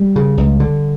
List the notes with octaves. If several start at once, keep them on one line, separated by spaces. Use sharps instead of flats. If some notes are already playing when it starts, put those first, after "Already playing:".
Already playing: G3
C#3
C#2
D3